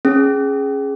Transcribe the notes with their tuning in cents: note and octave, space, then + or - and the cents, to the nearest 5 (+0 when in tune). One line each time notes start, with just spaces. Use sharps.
C#4 -10 G#4 +5